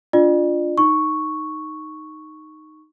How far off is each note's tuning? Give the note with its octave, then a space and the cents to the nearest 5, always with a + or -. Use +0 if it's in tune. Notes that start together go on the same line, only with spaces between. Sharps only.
D4 -15 F4 +0 D5 +40
D#4 -5 C#6 +0